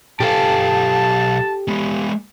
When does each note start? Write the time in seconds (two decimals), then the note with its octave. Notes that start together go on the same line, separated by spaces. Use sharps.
0.20 B1 G4 A4 F5 A5
1.68 G#3 B3